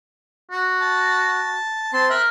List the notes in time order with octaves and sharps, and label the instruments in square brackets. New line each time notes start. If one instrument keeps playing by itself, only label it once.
[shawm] F#4
[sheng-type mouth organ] A5
[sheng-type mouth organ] C4 C6 [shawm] A5
[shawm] A#4 [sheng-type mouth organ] E5 F#6